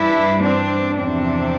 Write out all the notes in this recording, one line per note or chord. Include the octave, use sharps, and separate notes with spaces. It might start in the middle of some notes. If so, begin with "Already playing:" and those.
Already playing: G2 E3 G3 D4 E4
C4 D4
E2 C3 F3 C4 D4